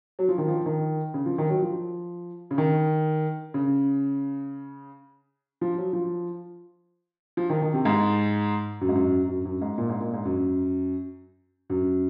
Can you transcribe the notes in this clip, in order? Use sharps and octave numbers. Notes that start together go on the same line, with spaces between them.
F#3
F3
D#3
F3
D#3
C#3
F3
D#3
F#3
F3
C#3
D#3
C#3
F3
F#3
F3
F3
D#3
D#3
C3
G#2
F#2
G#2
F#2
F#2
F#2
G#2
A#2
G#2
A#2
G#2
F#2
F#2